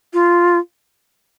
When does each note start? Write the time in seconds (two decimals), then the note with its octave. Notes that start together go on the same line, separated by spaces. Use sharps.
0.13 F4